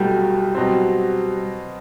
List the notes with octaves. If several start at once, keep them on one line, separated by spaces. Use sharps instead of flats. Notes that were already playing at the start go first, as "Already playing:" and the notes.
Already playing: C2 B2 F#3 G3 A3
B2 F#3 C4